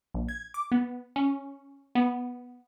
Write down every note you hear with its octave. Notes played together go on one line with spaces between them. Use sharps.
A#1
G#6
D6
B3
C#4
B3